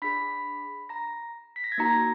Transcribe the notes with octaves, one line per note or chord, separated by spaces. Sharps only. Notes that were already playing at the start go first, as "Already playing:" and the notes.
D4 G#4 B5 B6
A#5 A#6
B6
A#6
G#6
A#3 D#4 F#4 A#5 A#6